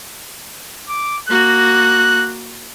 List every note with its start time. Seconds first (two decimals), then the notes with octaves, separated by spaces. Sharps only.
0.89 D6
1.29 A#3 F#4 F#6